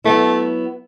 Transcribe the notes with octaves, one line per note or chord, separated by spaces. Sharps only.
F#3 A3 B3 E4